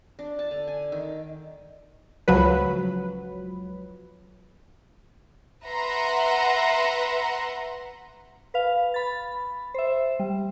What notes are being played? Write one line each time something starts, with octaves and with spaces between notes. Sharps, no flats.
D4
A5
D3
G#5
D#3
C#2 F3 F#3 B4
B4 E5 F#5 A#5 C6
B4 F5
B5 A6
C5 E5
G3